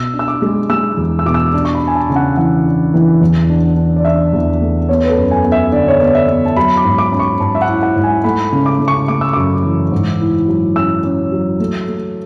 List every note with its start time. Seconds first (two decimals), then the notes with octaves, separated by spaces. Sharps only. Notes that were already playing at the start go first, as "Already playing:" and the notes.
Already playing: B2 E6
0.13 D4
0.19 E6
0.28 D6
0.42 G#3
0.70 G#3 E6
0.97 E2
1.19 E6
1.26 B2 D6
1.34 E6
1.53 D4
1.65 C#6
1.75 B5
1.81 D4
1.87 G#5
1.95 A5
2.09 C#3
2.16 F#5
2.37 E3 F#5
2.66 D4
2.94 E3
3.21 E2
3.49 D4
3.77 D4
3.96 D5
4.05 D4 E5
4.33 E2
4.61 A3
4.89 B3 C#5
5.04 B4
5.10 A4
5.17 F#2
5.31 G#5
5.45 B3
5.52 E5
5.72 D3 D5
5.88 C#5
6.01 B3 D5
6.15 E5
6.29 B3
6.46 A5
6.57 F#3 B5
6.77 D6
6.84 G#2
6.98 D6
7.12 C#4 B5
7.19 C#6
7.40 G#2 A5
7.55 E5
7.62 F#5
7.68 E4
7.83 F#5
7.96 G#2
8.03 G#5
8.24 A3 B5
8.52 C#3
8.66 D6
8.80 C#3
8.88 C#6
9.08 A3 D6
9.21 E6
9.33 F#2 D6
9.65 E3
9.92 G#2
10.20 E4
10.48 F#3
10.76 C#4 E6
11.04 C#4
11.32 F#3
11.60 A3
11.88 A3